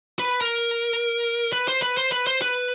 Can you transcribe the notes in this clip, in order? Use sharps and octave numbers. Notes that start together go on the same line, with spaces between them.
B4
A#4
B4
C5
B4
C5
B4
C5
B4